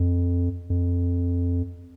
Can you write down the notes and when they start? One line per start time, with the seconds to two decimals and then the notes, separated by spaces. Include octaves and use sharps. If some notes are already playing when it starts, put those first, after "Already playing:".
Already playing: F2
0.70 F2